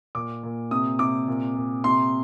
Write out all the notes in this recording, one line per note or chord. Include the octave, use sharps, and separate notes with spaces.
A#2 D6
A#2
C3 D#6
C3 D6
A#2
A#2
C3 C6